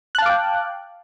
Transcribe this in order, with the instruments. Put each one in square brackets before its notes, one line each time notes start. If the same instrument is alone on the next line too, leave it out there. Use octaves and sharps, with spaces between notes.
[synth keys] F#6
A5
F5
D6
G5